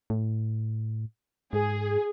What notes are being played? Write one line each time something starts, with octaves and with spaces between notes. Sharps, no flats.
A2
G#2 G#4